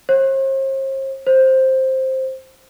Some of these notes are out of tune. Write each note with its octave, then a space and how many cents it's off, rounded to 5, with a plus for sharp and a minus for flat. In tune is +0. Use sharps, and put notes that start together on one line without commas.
C5 +45
C5 +5